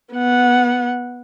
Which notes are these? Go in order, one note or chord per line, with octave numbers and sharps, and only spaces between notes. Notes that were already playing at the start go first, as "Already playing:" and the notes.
B3 F#5